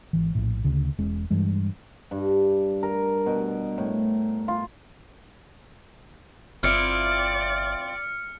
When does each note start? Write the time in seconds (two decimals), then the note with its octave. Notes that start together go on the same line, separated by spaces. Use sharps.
0.13 G#1 E3
0.35 A#1 A2
0.64 D2 C#3
0.98 E1 G#3 C#4
1.30 G2 E3 G#3
2.11 G2
2.83 A#4
3.26 B2
3.78 A2
4.48 F4
6.63 G1 C4 E4 F4 D5 F6 C#7